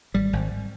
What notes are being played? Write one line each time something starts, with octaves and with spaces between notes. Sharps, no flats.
G#1 G3
G#1